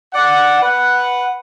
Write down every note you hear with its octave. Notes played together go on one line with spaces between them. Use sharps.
D5 F#5
B4 F#5